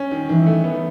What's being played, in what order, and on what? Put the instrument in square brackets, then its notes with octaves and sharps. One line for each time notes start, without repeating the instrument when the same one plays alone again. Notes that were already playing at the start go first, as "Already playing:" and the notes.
Already playing: [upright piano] C#4
D#3
[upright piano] D#3 [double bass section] E3
[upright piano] A3
B3